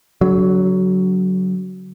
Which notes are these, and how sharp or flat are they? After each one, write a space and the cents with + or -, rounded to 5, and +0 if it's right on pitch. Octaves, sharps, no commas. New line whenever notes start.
D3 -45 F#3 +10